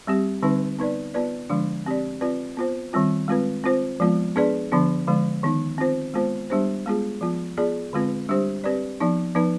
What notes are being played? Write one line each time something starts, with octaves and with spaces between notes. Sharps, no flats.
G3 C4 G4
D3 G3 C4 D#4 B4
B3 D#4 B4 D5
B3 F4 B4 D5
D3 F3 G#3 D4
C4 G4 D5
C4 F4 B4 D5
B3 F4 C5
D#3 G3 C4 F4
G#3 C4 F4 B4
C4 F4 C5
F3 G#3 B3 F4
B3 D4 G#4 B4 D5
D3 F3 B3 D4
D3 F3 G#3
D#3 B3 D#4
C4 F4 C5
G#3 B3 F4 C5
G3 B3 D4 G4 C5
G#3 B3 F4 G#4
F3 B3 F4
B3 F4 G#4 D5
D3 G#3 C4 F4 B4
G3 D4 G4 C5
C4 G4 B4 D5
F3 B3 D#4
F3 B3 D#4 B4